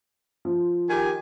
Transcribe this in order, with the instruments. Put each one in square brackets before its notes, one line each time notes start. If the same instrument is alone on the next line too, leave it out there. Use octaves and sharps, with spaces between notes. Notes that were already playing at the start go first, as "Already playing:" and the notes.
[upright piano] F3
[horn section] D#3 G4 G#5